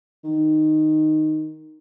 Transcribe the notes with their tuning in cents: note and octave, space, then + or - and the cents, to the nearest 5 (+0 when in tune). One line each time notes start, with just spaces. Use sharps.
D#3 -5